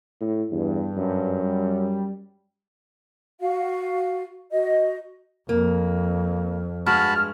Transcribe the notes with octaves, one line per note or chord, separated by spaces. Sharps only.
A2
E2 G2
F#2
G3
F#4 F5
F#4 D#5
F2 A#3
G2 G#3 F#4 A5 B5 F6